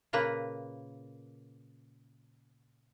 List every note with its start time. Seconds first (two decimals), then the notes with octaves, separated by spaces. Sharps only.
0.13 A#2 C#3 A#3 B4